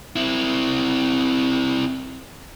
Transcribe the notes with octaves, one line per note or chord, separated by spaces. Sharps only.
C4 E4